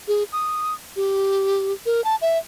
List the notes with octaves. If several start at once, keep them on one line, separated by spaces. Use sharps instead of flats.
G#4
D#6
G4
A#4
A5
E5